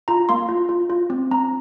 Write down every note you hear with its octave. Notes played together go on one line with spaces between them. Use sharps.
F4 A#5
A#3 C6
F4
F4
F4
C4
C4 A#5